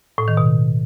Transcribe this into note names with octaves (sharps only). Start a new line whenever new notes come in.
A2
D#3
B2